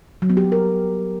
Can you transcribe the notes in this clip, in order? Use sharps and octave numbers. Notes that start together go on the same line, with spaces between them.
F#3
B3
G4
F#3
A#4